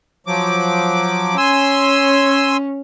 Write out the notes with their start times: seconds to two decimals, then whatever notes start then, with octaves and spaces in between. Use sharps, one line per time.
0.27 F3 F#3 D6
1.37 C#4 G#5 C6 E6